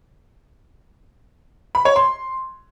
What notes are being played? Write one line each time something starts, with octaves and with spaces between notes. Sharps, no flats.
B5
C#5
C6